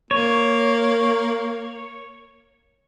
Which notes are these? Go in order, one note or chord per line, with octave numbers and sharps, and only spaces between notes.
A#3 C#5